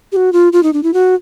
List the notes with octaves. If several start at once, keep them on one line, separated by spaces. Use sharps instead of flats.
G4
F#4
F4
F4
D#4
D4
E4
F#4